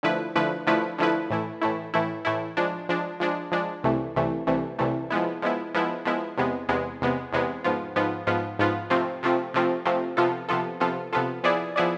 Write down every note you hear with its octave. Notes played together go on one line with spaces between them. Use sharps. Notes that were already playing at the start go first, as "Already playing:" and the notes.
D3 F3 A3 E4 B4
D3 F3 A3 E4 B4
D3 F3 A3 E4 B4
D3 F3 A3 E4 B4
A2 E3 A3 E4
A2 E3 A3 E4
A2 E3 A3 E4
A2 E3 A3 E4
F3 G#3 D4
F3 G#3 D4
F3 G#3 D4
F3 G#3 D4
C2 C3 E3 A3
C2 C3 E3 A3
C2 C3 E3 A3
C2 C3 E3 A3
F3 G#3 B3 E4
F3 G#3 B3 E4
F3 G#3 B3 E4
F3 G#3 B3 E4
E2 C3 G#3 B3
E2 C3 G#3 B3
E2 C3 G#3 B3
E2 C3 G#3 B3
G#2 F3 B3 F4
G#2 F3 B3 F4
G#2 F3 B3 F4
G#2 F3 B3 F4
C3 F3 A3 C4 F4
C3 F3 A3 C4 F4
C3 F3 A3 C4 F4
C3 F3 A3 C4 F4
C3 F3 B3 F4 A4
C3 F3 B3 F4 A4
C3 F3 B3 F4 A4
C3 F3 B3 F4 A4
F3 B3 E4 G#4 D5
F3 B3 E4 G#4 D5